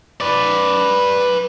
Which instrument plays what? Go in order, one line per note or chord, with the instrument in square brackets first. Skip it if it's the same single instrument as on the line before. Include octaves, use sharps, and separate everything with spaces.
[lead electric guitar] B4 D5